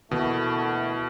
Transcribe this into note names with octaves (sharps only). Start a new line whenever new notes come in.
D2 B2 E3 A3 A#3 E4